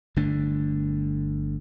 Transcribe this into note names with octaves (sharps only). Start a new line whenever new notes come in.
G1 D3 A3 D4